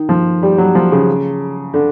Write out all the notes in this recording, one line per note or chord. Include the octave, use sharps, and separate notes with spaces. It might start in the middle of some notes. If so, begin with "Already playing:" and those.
Already playing: D#3
F3
G3
F#3
F3
C#3
D3